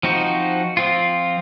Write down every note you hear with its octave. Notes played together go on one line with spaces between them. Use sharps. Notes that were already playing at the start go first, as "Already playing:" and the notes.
F3 C4 D#4 F#4
F3 C4 F4